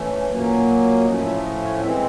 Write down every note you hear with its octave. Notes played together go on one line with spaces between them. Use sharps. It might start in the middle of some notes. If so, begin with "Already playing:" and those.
Already playing: E3 A3 C#4
A#2 F#3 A#3 C#4
A2 F3 A3 C#4 D#5
E5
D#5
C#5
E3 G#3 C4 E5